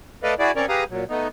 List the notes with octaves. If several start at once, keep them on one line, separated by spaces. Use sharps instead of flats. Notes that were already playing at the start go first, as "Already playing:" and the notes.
A3 A4 B4 D5 D#5 F5
E4 F#4 G#4 D5
C4 C#4 A#4 C#5 D5
G4 G#4 B4 F5 A#5 D#6
A#2 F#3
A3 B3 D#4